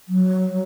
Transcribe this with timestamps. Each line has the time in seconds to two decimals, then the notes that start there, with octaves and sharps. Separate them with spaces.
0.09 F#3